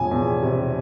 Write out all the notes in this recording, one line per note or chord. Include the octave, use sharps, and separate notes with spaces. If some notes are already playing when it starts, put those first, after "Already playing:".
Already playing: E1 F3 G#5
E2
C3